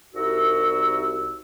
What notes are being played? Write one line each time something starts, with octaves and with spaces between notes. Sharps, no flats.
C2 D#4 F#4 E6